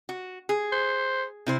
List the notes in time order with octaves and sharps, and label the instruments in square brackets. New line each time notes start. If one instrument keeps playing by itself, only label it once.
[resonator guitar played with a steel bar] F#4
G#4
[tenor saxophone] C5
[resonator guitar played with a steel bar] C3 E4 C5